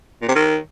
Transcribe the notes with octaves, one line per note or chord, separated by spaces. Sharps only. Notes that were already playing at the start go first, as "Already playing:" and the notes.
A#2
C3
D#3